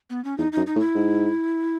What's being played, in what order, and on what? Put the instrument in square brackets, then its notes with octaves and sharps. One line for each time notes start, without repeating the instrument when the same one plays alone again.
[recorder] B3
C#4
[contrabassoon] E2 [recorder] D#4
[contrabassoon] F#2 [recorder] D#4
[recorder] D#4
[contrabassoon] A2
[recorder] E4
[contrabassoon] G#2